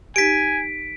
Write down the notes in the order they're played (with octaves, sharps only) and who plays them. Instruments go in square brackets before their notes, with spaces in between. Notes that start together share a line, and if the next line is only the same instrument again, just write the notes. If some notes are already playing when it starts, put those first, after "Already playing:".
[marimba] D#4 G4 [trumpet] G#5 [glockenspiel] B6 D7